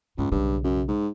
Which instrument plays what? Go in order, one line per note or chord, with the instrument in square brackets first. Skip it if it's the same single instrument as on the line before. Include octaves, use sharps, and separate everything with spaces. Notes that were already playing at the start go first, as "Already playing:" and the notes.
[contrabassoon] C#2 [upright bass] G2
[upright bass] B1 C#3 [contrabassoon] G2
[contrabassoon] F#2
G#2